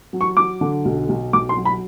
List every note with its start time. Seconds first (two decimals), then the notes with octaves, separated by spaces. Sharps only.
0.13 F#3
0.21 C#6
0.37 F#3 D6
0.61 D3
0.85 B1
1.09 B1
1.33 B1 D6
1.49 C6
1.57 F#3
1.65 B5